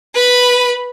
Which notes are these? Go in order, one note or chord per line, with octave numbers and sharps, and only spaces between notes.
B4 B5